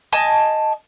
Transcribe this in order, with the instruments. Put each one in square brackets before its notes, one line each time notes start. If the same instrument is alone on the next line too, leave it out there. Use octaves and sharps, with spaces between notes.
[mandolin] D#5 G#5 A5